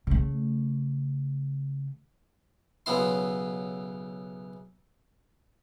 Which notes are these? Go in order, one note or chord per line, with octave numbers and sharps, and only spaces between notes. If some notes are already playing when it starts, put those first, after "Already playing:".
C#3 A3
B1 C#3 B3 E4 C6